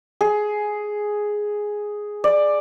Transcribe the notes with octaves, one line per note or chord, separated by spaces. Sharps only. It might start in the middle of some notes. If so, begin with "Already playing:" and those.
G#4
D5